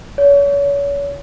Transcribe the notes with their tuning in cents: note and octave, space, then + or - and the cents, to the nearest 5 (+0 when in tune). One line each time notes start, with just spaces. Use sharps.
C#5 +35